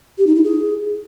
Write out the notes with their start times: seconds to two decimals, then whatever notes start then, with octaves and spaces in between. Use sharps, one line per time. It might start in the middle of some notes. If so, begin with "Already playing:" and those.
0.18 G4
0.27 D#4
0.35 E4
0.44 G#4